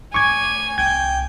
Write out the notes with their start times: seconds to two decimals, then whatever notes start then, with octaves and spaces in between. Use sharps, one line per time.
0.14 D3 A3 G#5 C#6 D6 G#6
0.78 C2 G5 G#6